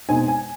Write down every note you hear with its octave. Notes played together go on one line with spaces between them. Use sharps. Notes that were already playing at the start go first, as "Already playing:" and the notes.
B2 G#3 C4 D#4 G#5
G#5